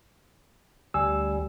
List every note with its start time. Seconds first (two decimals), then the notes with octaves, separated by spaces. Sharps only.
0.94 D2 G3 G#5 E6